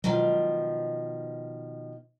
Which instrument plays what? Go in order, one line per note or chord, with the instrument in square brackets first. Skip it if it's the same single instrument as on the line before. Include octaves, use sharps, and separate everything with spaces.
[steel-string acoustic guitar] B2 D#3 F3 [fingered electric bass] F#3 G#3